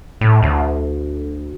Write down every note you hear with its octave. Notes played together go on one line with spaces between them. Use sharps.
A2
D2